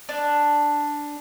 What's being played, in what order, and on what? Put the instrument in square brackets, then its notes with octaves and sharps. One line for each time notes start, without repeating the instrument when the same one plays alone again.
[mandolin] D4